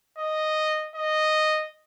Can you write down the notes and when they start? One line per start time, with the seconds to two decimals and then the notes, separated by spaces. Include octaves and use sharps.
0.18 D#5
0.96 D#5